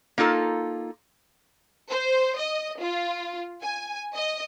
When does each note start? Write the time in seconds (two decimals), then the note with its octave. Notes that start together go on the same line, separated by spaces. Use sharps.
0.18 A#3 D#4 F4 A4
1.90 C5
2.38 D#5
2.79 F4
3.62 G#5
4.15 D#5